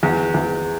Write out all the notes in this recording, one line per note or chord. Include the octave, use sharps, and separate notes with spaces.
E2
E2